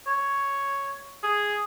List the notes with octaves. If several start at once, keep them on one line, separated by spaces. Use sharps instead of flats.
C#5
G#4